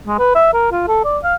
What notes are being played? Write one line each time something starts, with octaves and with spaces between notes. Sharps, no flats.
G#3
B4
E5
A#4
F4
A4
D5
F5